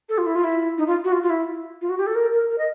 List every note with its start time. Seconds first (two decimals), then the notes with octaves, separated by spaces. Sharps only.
0.09 A4
0.18 F4
0.26 E4
0.35 F4
0.44 E4
0.78 D#4
0.87 F4
1.04 F#4
1.12 F4
1.23 F4
1.30 E4
1.81 F4
1.89 F#4
1.98 G4
2.06 A4
2.15 A#4
2.33 A#4
2.50 A#4
2.58 D#5